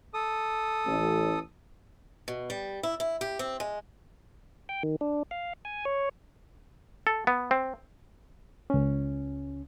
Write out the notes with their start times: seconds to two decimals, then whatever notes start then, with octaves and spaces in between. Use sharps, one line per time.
0.14 A4 D#6
0.85 A1
2.28 B2
2.50 G3
2.83 E4
3.00 E4
3.21 G4
3.39 C4
3.60 G#3
4.69 G5
4.83 D#3
5.01 D4
5.31 F5
5.65 G#5
5.85 C#5
7.07 A4
7.27 B3
7.51 C4
8.70 C#2 C#4